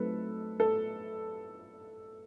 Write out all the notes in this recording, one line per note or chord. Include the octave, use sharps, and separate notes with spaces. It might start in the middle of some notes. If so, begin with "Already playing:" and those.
Already playing: F#3 A3 C4 D#4 A4 B4
A4